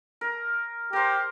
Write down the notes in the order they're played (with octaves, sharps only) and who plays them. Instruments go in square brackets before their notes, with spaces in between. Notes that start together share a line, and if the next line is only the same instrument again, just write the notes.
[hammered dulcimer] A#4
[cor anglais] G4 [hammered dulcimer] A#4 C5